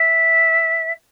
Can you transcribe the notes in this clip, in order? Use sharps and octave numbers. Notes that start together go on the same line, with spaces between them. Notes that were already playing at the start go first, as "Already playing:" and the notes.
Already playing: E5